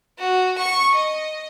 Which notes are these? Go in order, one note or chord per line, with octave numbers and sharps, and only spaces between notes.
F#4
C#6
D#5